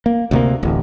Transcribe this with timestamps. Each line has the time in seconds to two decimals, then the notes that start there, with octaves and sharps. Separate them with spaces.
0.06 A#3
0.31 D2 C3 A#3
0.63 D1 A1